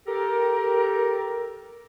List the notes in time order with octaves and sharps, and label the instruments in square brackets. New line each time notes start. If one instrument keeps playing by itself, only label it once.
[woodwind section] G4 A4 A#4